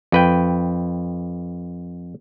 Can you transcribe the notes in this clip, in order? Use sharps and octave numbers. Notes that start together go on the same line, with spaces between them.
F2 B4 G5